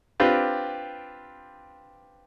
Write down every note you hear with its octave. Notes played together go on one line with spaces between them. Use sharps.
C4 D4 F4 G4 B4